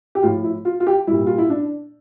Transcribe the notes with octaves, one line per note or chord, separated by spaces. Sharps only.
G4
A2 F3 F4
E4
F4
F4
G4
A#2 G3 E4
F4
E4
D4